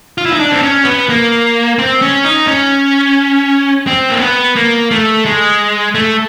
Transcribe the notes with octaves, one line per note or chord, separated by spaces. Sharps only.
F4
E4
D#4
D4
C4
C#4
B3
A#3
C4
C#4
D#4
C#4
C4
A#3
B3
A#3
A3
G#3
A3